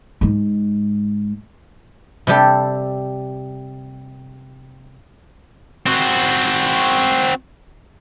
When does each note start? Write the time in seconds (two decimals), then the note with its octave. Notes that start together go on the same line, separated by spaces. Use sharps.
0.21 G#2 G#3
2.27 C3 G3 G4 A4
5.86 C4 F#4